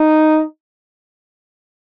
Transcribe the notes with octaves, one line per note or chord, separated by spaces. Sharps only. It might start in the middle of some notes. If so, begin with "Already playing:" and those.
Already playing: D#4